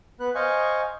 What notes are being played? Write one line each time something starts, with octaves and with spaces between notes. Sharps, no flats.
B3 B4 F#6
C5 D#5 F5 G#5 C#6